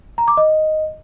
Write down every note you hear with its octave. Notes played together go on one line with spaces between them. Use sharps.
A#5
D6
D#5